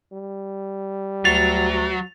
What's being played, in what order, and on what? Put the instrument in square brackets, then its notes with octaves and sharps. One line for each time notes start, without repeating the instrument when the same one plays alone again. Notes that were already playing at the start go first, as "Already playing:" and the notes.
[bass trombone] G3
[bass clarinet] D2 [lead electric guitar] F#3 [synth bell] A6 F7